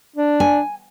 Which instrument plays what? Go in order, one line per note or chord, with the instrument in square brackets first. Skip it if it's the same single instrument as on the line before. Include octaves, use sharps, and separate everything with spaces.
[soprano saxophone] D4
[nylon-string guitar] G#5